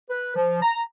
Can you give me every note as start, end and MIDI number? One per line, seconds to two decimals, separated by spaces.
0.10 0.34 71
0.36 0.61 53
0.62 0.81 82